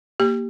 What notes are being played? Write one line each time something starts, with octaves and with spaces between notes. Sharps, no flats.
A#3 G4